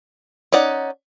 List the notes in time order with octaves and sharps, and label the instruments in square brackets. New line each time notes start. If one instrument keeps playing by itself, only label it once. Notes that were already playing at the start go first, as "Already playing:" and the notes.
[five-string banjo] C#4 D#4 D5 F#5